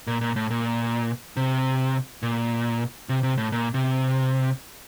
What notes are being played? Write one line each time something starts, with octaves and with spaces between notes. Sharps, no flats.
A#2
A#2
A2
A#2
C3
A#2
C3
C3
A2
A#2
C3